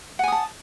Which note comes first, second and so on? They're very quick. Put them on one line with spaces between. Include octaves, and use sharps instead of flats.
F#5 G#5 D#6 A5